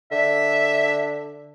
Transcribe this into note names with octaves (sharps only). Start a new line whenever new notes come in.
D3 E5